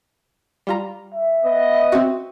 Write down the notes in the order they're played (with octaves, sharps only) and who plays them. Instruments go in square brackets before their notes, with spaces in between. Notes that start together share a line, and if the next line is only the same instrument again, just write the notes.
[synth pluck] G3 F4 A#5
[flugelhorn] E5
[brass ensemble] B3 D#5
[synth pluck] C4 F#4